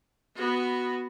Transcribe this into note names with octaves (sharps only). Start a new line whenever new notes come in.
B3 F#4